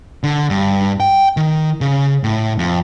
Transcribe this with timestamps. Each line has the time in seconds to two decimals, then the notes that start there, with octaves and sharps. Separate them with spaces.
0.23 D3
0.50 G2
1.00 G5
1.37 D#3
1.81 C#3
2.23 A2
2.59 F2